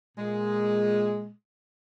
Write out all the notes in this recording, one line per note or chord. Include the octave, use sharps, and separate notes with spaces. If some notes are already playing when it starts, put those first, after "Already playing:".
A#2 G#3